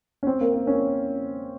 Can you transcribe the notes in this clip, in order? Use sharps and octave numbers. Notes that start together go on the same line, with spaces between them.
C#4
C4
A#3
A#3
C#4